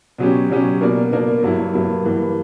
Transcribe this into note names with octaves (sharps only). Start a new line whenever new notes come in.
B2 F#3 C#4 G4
B2 F#3 C#4 G4
B2 A#3 D4 A#4 D5
B2 A#3 D4 A#4 D5
G2 F#3 A#3 E4
G2 F#3 A#3 E4
G2 E3 A#3